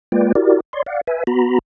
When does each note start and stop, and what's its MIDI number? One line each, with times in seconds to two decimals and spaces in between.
0.12 0.32 56
0.12 0.32 58
0.12 0.32 65
0.12 0.32 71
0.12 0.32 74
0.12 0.32 79
0.35 0.60 64
0.35 0.60 66
0.35 0.60 67
0.35 0.60 70
0.35 0.60 74
0.73 0.83 73
0.73 0.83 74
0.73 0.83 84
0.86 1.01 74
0.86 1.01 77
0.86 1.01 78
1.07 1.24 71
1.07 1.24 76
1.07 1.24 80
1.27 1.59 59
1.27 1.59 66
1.27 1.59 82
1.27 1.59 83